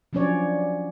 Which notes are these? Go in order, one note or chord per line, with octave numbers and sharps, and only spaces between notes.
F3 F#3 C#4 D4 C#5 D5